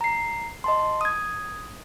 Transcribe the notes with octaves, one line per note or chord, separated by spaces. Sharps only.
A#5 C7
D#5 A5 C6
D#6 G#6